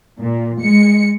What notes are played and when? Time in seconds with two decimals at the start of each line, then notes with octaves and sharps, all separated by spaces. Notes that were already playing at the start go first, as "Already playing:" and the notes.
0.20 A#2
0.61 G#3 C#7